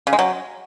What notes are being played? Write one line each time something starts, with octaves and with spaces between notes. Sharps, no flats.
C#3
G#3
F#3